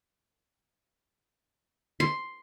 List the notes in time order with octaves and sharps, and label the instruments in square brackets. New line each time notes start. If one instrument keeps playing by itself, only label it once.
[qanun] C6